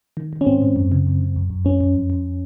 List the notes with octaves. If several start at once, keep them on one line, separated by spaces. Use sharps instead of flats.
D#3
D#3
C#4
G#2 C4
G#2
F#2
C#3
F#2
C#3
F#2
F#2
F#2 C#4
F#2
F2
F2